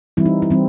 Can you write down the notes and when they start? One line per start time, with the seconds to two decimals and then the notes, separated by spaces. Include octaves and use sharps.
0.17 E3 G3 C4 E4
0.26 D#4
0.42 E4
0.50 E3 G3 C4